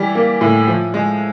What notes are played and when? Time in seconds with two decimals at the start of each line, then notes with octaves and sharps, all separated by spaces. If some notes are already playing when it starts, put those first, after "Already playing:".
Already playing: E3 G3
0.15 A#3
0.41 A2
0.68 F3
0.94 G#3